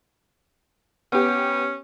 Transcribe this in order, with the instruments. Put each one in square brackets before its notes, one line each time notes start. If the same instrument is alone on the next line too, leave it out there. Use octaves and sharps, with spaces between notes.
[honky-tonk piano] B3 G4 [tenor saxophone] C#4